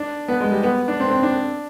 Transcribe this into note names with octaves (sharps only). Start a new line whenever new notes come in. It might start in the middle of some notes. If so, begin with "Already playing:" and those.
Already playing: D4
B3
G#3
G3
B3
D4
C4
C4
D4